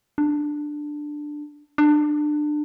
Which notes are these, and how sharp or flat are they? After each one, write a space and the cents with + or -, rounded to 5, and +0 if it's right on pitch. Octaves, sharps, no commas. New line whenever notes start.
D4 +10
D4 +25